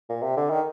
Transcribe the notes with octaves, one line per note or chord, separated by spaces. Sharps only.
A#2
C3
D3
D#3